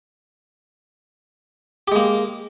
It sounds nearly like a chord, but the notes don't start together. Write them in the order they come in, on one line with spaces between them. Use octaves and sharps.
G4 G#3 A#3